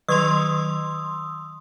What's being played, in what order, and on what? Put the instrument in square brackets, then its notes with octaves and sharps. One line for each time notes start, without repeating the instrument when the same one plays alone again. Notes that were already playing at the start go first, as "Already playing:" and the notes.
[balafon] D#3 F#3 [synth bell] C6 D#6 E6